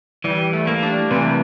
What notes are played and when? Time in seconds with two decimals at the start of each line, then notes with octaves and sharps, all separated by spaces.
0.24 E3 G3
0.53 A3
0.67 A#3
0.83 D4
1.11 C3 E3